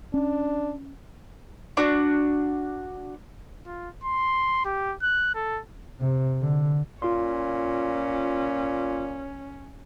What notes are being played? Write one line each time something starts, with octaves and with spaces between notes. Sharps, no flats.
C#4 D4
D4 F#4
F4
C6
G4
F#6
A4
C3
D3
A#2 C#4 F4 C6